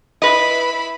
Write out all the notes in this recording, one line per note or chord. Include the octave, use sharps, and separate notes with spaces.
E4 B4 D#5 B5